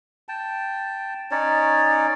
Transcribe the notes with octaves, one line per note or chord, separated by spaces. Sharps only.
G5 A5
C#4 D#4 C#5 D5